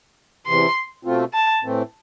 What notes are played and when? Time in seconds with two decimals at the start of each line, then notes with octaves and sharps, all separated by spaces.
0.46 E2 C3 E3 C6
1.05 B2 A3 C4 F4
1.33 A5
1.62 A2 E3 A3 C4